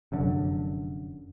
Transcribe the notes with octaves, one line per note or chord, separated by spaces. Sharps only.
F1 F#2 D3